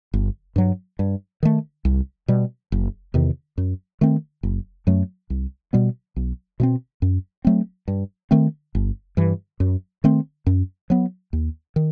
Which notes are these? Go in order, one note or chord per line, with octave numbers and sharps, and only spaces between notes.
G1
G2 F#3
G2
D#3 A3
C2
B2 G3
F#1
E2 C3 D#3
F#2
D#3 A3 C4
F#1
F#2 F#3 A3
C2
B2 G3 B3
B1
B2 A3 C4
F#2
F#3 A3 C4
G2
D#3 A3 C4
G1
G2 E3
F#2
D#3 A3 C4
F#2
F#3 B3
D#2
D#3